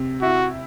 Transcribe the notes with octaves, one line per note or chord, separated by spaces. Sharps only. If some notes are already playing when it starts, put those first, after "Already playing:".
Already playing: C3
E4 F#4